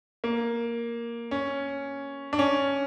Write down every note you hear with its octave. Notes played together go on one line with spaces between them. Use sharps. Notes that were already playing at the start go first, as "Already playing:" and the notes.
A#3
C#4
D4
C#4